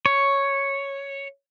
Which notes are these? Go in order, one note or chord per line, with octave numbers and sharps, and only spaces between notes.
C#5